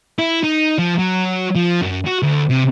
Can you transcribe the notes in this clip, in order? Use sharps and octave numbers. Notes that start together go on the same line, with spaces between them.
E4
D#4
F3
F#3
F3
F#2
F#4
D2
C3